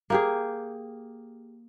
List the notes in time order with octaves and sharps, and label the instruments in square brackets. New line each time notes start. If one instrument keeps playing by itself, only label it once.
[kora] A#3 G4 G#4